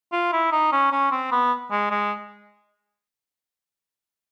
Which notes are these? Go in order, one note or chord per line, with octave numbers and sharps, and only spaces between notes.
F4
E4
D#4
C#4
C#4
C4
B3
G#3
G#3